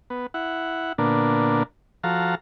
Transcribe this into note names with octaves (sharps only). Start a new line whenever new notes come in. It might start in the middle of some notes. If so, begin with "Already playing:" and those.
B3
E4 F#5
A#2 D3 A#3 B3 D4
F3 F#4 A4 F5 A#5